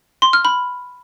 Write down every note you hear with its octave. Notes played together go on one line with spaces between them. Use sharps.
C6
F6
B5